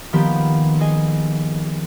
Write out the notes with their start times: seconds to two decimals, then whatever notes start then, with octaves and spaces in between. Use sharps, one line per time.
0.13 D#3 F3 A#3 B3 G4
0.81 G#4 D#5 G#5